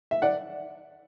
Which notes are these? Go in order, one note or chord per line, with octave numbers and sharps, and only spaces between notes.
E5
D5 F#5